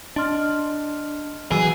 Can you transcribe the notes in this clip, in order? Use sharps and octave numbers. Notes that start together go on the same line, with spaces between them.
D4 D#5 C6 F6
E3 F#3 G#4 E6